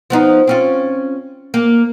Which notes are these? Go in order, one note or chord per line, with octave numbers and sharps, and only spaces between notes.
F3 B3 D#4
C4 C#4 F4
A#3